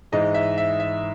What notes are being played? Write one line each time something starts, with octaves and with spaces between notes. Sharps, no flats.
G#2 E3 G#3 D#5
E5
E5
E5